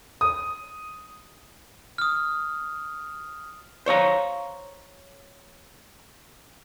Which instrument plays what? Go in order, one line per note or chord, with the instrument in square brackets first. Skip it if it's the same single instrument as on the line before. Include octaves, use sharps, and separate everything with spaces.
[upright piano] D#6
[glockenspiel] D#6 F6
[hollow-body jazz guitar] C5 C#5 F5 A#5